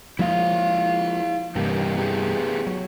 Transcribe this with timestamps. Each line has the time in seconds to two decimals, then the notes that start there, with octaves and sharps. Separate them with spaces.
0.19 F3 G#3 A#3 E4 F5
1.55 E2 G2 C3 E3 A#3 G4
1.97 B3 G4 G#4
2.67 F#3